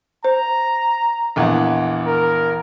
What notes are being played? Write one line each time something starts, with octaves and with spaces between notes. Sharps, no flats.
C5 A#5
A#1 E2 F#5
A#4